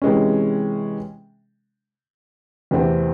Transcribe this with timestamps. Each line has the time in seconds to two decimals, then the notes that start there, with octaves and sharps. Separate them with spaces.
0.02 C3 E3 G#3 C#4
2.71 E2 C3 E3 A3 C4